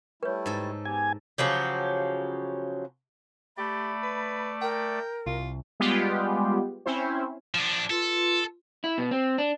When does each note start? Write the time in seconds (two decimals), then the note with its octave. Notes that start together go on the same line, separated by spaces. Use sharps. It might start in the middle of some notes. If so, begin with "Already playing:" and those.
0.23 G3 A3 E4 B4 C#5
0.46 G#2 A4
0.85 B3 G4 G#5
1.38 C#3 F3 F#3 G4
3.58 A3 G4 D5 B5
4.03 B4
4.62 A#4 G5
5.26 C2 F4
5.80 G3 G#3 B3 F4 G4
6.86 C4 C#4 E4 C5
7.55 F3 D4
7.90 F4 A4 B4 C6
8.84 E4
8.98 B2
9.11 C4
9.38 D4